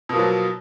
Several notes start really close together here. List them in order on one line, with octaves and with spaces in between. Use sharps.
B2 A#3 F3 F#3